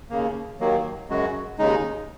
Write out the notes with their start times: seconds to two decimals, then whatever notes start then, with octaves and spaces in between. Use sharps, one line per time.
0.10 D#2 C#3 A#3
0.60 D#2 D#3 F#3 A#3
1.09 F#2 C#3 G#3 F#4
1.59 D#2 C#3 G#3 D#4